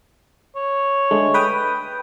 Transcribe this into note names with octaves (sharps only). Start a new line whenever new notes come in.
C#5
D3 G#3 A3
B4 G5 D#6